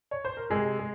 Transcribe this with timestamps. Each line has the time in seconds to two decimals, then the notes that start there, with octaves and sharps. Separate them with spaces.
0.11 C#5
0.25 C5
0.37 A#4
0.50 C3 G#3 G#4
0.79 G#3